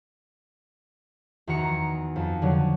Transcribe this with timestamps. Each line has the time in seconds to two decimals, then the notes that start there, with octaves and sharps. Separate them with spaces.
1.47 E2 D#3 F#4 A#5 C#7
2.16 F2
2.42 D3 F#3